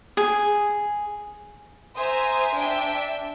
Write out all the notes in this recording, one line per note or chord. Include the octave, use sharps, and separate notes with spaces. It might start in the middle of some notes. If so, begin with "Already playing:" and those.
G#4
C5 E5 G#5 A#5 D#6
D4 E5 G5